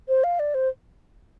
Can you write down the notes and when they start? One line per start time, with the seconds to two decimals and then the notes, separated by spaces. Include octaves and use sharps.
0.08 C5
0.24 F5
0.39 D5
0.54 C5